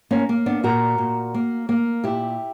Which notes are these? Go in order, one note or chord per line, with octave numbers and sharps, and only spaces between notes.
A#3 C#4
A#3
B3 D4
A#2 F#4 A#4
A#2
A#3
A#3
A#2 E4 G4